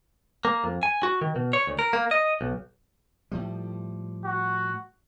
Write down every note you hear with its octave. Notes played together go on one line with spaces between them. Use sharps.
A#3
F2
G#5
F#4
D#3
B2
C#5
D2
A#4
A#3
D#5
B1
A2 F3 G3
F#4